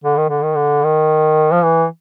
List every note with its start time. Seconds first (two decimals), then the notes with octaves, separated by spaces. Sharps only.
0.04 D3
0.17 D#3
0.29 D3
0.43 D#3
0.55 D3
0.84 D#3
1.52 F3
1.63 E3